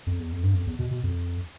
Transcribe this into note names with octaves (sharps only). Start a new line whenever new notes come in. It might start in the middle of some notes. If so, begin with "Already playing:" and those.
F2
E2
F2
G2
F2
E2
B2
B2
F2